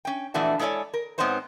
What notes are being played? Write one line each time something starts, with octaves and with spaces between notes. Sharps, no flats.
C#4 G5
F2 A#2 E3 A3 D4 F#4
G#3 E4 A4 C#5 D5 G#5
A#4
G#2 B3 C4 D#4 C5 C#5